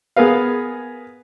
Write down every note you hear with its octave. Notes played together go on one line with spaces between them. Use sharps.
B3 G#4 A#4 B4 F5